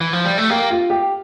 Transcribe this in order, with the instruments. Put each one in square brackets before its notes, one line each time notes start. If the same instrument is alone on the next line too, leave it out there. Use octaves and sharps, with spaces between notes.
[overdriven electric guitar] E3
F3
G3
A3
[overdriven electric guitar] A#3 [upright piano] G4
[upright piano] F4
G4